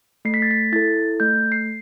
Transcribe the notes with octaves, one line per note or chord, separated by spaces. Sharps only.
A3 C7
B6
A6
B6
E4 A4 A6
A3 G6
C7